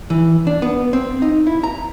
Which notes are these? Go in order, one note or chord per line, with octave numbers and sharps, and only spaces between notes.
E3
D4
B3
C4
D#4
E4
A#5